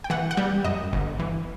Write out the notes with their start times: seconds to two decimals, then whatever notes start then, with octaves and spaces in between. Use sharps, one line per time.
0.04 G5
0.10 E3 F#5
0.31 F#5
0.37 G3 G5
0.64 F#2 D#5
0.93 G1
1.19 E3